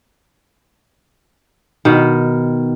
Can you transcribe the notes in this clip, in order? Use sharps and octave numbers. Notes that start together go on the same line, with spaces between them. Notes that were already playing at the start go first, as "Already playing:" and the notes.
B2 D#3